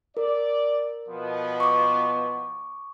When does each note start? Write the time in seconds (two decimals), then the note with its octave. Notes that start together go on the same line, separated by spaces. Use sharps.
0.17 A#4 D5
1.09 B2 F3 B3
1.60 C#6 D6